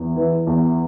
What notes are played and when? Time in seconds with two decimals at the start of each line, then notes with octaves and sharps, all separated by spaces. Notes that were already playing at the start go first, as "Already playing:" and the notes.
Already playing: E2
0.16 E3
0.47 E2